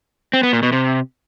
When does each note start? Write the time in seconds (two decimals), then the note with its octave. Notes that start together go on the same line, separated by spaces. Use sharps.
0.33 C4
0.43 B3
0.53 A#2
0.63 B2
0.72 C3